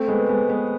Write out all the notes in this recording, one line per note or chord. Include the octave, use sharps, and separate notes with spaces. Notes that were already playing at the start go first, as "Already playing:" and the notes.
Already playing: A3 C4
G#3 B3
G#3 B3
G#3 B3